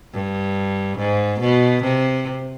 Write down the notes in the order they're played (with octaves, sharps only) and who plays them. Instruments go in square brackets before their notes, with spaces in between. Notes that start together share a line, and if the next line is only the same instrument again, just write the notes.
[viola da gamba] G2
G#2
B2
C3